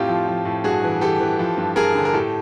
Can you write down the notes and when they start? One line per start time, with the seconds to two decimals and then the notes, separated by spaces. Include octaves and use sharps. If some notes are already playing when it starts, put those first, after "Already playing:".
Already playing: F2 A2 F4 G4
0.09 F3
0.28 F3
0.45 A2
0.64 G2 F#4 G#4
0.84 E3
1.01 E3 G4 A4
1.20 E3
1.39 F3
1.57 G2
1.76 G2 G#4 A#4
1.95 D3
2.05 A#4
2.13 A2 G4 A4